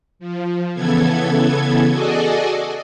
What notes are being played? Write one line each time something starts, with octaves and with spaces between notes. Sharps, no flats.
F3
C#3 E3 B3 A4 G#6
F#4 G#4 A4 D5 D#5 G#5